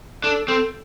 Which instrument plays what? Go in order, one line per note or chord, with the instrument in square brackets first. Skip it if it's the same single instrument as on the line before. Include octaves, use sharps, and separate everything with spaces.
[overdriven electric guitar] D4 [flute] A4
[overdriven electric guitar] C4 [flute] A4